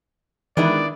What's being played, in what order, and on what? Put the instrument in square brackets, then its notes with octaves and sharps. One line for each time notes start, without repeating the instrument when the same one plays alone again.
[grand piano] D#3 [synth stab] E3 G#3 [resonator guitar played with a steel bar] B3 D4 E4 [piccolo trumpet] D5